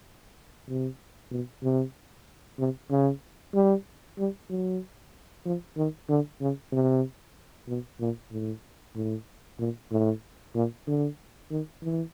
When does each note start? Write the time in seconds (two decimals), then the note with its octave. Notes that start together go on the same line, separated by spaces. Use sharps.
0.68 C3
1.31 B2
1.63 C3
2.59 C3
2.90 C#3
3.54 G3
4.18 G3
4.50 F#3
5.45 F3
5.77 D#3
6.09 D3
6.41 C#3
6.73 C3
7.68 B2
8.00 A#2
8.32 A2
8.95 A2
9.59 A#2
9.91 A2
10.55 A#2
10.87 D3
11.51 D#3
11.82 E3